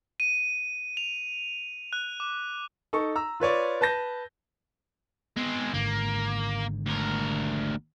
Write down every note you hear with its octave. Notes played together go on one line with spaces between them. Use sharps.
D#7
F7
F#6
D6
D#4 A4 C#6
A#5 E6
F4 B4 C#5 D5
B4 A5 G6 A#6
G#3 B3 C4
G#1 G#2 D3 A#3
D2 A#4